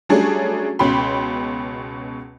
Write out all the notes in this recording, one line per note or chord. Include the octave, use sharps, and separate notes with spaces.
F#3 G3 A3 C#4 D4 G#4
C#2 B2 C#4 G5 B5 C6